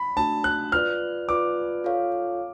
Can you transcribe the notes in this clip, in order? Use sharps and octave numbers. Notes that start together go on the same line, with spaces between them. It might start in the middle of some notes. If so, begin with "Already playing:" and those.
Already playing: B5
A3 D4 F#4 A5
F#6
F4 B4 D5 F6
F4 B4 D5 D6
F4 A4 C#5 F5